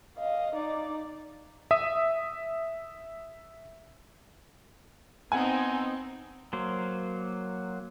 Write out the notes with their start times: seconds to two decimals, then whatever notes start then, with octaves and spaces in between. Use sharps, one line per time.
0.17 D#5 F5
0.55 D#4 D5
1.71 E5 D#6
5.32 B3 C4 D#4 F#5 G#5
6.53 F#3 A#3 C5